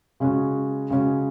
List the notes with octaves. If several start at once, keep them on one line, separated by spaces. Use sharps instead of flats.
C#3 G#3 C#4 F#4
C#3 G#3 C#4 F#4